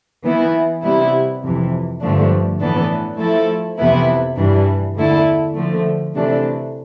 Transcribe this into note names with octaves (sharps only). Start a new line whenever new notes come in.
E3 B3 E4
C3 G3 B3 E4
F2 C3 E3
G2 D3 F3 A3 D4
A2 E3 B3 D4 A4
F3 A3 E4 A4
F2 C3 E3 B3 E4
G2 E3 G3 D4
E2 D3 A3 E4 A4
D3 F3 A3
C3 E3 A3 D4